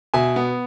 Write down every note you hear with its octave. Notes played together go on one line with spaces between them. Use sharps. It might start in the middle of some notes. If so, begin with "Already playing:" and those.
B2 E5 G#5
B3